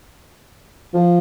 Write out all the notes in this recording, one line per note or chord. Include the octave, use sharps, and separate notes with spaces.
F3